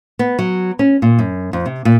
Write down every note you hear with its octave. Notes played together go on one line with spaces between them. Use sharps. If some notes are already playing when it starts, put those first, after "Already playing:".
B3
F#3
C#4
A#2
F#2
F2
C3
A#2